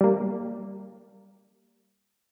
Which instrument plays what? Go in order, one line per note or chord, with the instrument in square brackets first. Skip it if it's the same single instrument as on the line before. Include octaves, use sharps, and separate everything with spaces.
[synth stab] G3 A#3